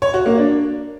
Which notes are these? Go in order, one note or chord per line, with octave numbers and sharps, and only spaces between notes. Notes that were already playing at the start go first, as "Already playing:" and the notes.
C#5
F#4
A#3
D4